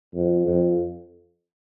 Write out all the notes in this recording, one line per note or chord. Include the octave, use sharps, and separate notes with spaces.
F2
F2